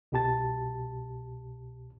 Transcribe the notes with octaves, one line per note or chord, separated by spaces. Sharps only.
C2 B2 G4 A5 A6